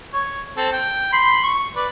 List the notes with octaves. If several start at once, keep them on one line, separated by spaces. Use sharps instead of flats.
C#5
C4 A4
G5
B5 C6
C#6
B4 D5